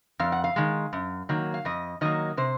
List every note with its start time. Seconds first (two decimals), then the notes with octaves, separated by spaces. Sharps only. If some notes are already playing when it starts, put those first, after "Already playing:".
0.19 F2 F5
0.32 F#5
0.44 F5
0.56 D#3 G#3
0.93 F#2
1.29 D#3 F#3 A#3
1.54 F5
1.65 F2 D#5
2.01 D#3 F#3 A#3 D#5
2.37 C3 C5